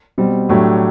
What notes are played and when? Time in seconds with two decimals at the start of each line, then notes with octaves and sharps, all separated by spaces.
0.18 B2 G3 C4
0.49 A2 F#3 A3 D4 G4